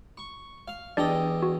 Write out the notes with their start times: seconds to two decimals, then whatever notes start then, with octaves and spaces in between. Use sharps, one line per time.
0.17 C#6
0.68 F5
0.97 E2 D4 G4 D5 D#5
1.43 F#4